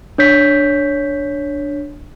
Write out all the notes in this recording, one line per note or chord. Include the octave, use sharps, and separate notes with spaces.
D4 C#5 G6 B6